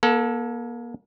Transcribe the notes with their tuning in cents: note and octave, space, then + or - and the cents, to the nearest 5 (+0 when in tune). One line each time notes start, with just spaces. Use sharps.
A#3 +35 A4 +0